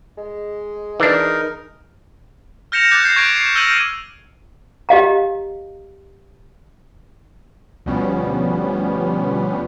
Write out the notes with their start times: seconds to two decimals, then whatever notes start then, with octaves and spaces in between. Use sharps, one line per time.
0.18 G#3
1.00 E3 D4 D#4 A#4
2.72 F6 G6 A#6 C#7 E7 F7
2.91 D6 F#6 G6 A6
3.04 G6 C7
3.16 C#6 G#6 A#6 D7 F7
3.36 C7 E7
3.55 E6 F6 G6 A#6 D#7 F#7
4.89 G4 D#5 F5 A#5
7.86 D2 B2 F3 G3 B3 C#4